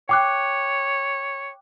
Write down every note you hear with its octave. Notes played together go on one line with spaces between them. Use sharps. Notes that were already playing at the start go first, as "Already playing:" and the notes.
C#5 G5 D6 F#6